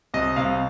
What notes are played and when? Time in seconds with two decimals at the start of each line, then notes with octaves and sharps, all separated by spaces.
0.14 C2 D#5
0.36 C2 F5